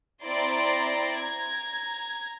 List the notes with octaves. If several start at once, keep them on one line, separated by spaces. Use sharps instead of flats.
C4 E4 D5 A#5 C6
A#5 G#6